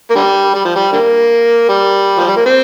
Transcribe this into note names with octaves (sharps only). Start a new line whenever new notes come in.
A#3
D3 G3
G3
F3
G3
D3 G3 A#3
G3
F3
G3
A#3
C4